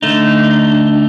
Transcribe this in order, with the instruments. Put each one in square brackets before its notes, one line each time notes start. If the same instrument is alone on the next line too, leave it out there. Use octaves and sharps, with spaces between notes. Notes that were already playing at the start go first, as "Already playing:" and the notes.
[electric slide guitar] D3 A3 D#4 [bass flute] D4